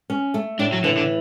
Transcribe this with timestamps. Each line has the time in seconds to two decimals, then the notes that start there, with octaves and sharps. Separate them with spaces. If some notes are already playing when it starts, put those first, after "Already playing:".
0.10 C#4
0.34 A3
0.59 A2 D4
0.72 F#3
0.84 D3 E3
0.97 D3